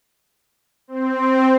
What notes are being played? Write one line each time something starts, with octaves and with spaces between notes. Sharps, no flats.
C4